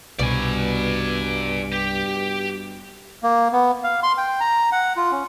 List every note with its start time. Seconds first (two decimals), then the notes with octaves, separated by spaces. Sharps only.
0.19 C2 G2 B2 D5 G#5
1.73 G4
3.23 A#3
3.53 B3
3.84 F5
4.03 C6
4.18 G5
4.40 A#5
4.72 F#5
4.97 F4
5.12 C#4